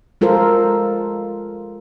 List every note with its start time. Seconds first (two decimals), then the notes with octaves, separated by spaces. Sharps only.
0.21 G#3 F4 A4 A#4 C5